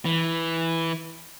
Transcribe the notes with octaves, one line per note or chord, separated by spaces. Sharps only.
E3